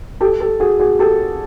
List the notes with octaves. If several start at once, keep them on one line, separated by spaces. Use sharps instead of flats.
G4 A4
G4 A4
F#4 G#4
F#4 G#4
G4 A4